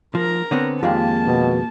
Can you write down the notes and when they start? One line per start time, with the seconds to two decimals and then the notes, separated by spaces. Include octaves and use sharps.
0.15 F3 A#4 A#5
0.51 D3 B3 C4 C#5 F#5
0.83 F2 D#3 G#3 A#3 F4 G4 A5
1.26 B2